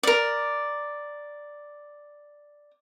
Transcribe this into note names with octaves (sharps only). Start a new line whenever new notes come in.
A#4 D5